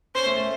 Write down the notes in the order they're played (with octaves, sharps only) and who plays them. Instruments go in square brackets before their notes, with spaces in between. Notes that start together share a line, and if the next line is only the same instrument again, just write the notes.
[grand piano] C#4 [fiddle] C5
[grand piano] A3
A3